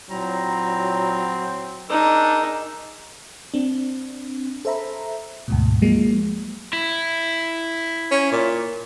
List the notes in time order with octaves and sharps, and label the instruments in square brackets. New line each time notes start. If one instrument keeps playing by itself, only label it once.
[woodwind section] A#2 E4 A#5 [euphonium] F#3 [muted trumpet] C4
[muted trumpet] D4 [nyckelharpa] D#4 [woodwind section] G#4 A#4 E6
[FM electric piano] C4 D4
A4 C5 E5 A#5 B5
D2 G#2 B2
F3 F#3 G#3 A#3
[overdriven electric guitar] E4
[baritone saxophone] C#4
A#2